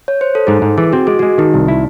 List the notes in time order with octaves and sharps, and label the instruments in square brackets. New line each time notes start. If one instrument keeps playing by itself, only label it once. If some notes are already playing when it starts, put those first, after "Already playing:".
[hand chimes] C#5
C5
A4
[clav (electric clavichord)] G#2 [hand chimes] G#4
[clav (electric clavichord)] G#2
[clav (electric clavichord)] E3 [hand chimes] G#4
[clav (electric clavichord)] C4 [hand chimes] F#4
[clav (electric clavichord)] G#3 [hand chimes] G#4
[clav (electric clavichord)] G#3 [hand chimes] F#4
[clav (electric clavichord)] D#3 [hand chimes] D#4
[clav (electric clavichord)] C2
E4